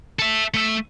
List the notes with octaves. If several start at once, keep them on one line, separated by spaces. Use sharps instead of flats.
A4 E5
A3 E5